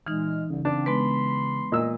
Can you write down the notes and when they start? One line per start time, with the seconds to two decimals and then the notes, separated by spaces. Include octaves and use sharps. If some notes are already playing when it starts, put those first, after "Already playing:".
0.06 A#2 E3 G#3 D#4 F6
0.50 C2 C#3
0.65 A#3 C4 D4
0.86 G#3 B3 B4 B5 C6
1.72 A#2 D#5 E6